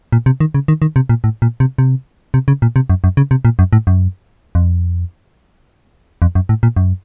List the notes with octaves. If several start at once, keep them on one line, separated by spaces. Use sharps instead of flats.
A#2
C3
D#3
C#3
D#3
D#3
C3
A#2
A2
A#2
C3
C3
C3
C#3
A#2
C3
F#2
F#2
C#3
C3
A#2
F#2
A2
F#2
F2
F2
F#2
A2
A#2
F#2